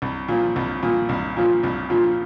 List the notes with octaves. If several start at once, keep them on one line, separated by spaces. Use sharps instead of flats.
C2
A#2 F3
C2
A#2 F3
C2
A#2 F3
C2
A#2 F3